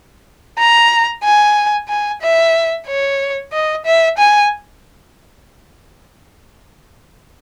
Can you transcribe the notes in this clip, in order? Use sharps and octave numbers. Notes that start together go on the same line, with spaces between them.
A#5
G#5
G#5
E5
C#5
D#5
E5
G#5